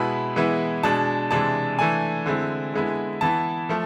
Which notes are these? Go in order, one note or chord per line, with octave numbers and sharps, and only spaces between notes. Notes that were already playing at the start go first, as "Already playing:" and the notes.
Already playing: B2 G#3 B3 E4 B5
E3 G#3 B3 E4
B2 G#3 D4 A5
C3 E3 G#3 D4 A5
E3 A3 D4 G#5
D3 G#3 C4 E4
D3 G#3 B3 E4
E3 B3 E4 A5
F3 A3